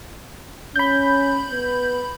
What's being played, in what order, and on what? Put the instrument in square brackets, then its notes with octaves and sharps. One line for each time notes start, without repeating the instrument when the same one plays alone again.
[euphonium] C#4 [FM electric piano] B5 G6
[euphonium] B3